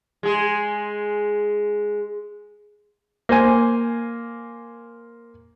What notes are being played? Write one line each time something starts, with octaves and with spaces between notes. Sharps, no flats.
G#3 G#4
A#3 C5 G#5